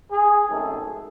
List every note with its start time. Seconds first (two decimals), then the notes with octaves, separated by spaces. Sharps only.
0.12 G#4
0.49 G#1 F#2 D#3 A3 A4